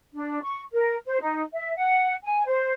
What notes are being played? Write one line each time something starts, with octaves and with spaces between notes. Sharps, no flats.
D4
C#6
A#4
C5
D#4
E5
F#5
G#5
C5